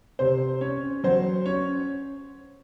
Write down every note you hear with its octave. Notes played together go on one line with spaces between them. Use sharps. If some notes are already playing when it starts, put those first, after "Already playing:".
C3 C5
C#4 C#5
F#3 C5
C#4 C#5